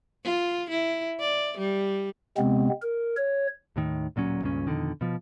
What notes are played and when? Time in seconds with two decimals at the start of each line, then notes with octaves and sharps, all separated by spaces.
0.24 F4
0.70 E4
1.20 D5
1.58 G3
2.37 C3 G#3 B3 C4
2.82 A#4
3.17 C#5
3.76 D#2 A2 D#3
4.16 D1 A#2 F#3 C#4
4.42 C#2 G2 A#2 C#4
4.67 F2 B2 D3 D#3
5.01 B2 F3